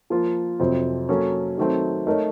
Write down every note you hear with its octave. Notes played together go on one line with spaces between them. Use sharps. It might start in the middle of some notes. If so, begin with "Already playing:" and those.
F3 A#3 F4
F2 C3 F#3 C4
F#3 A#3 C#4 A4
D#3 F#3 A3 C4
A3 D#4 A#4 C#5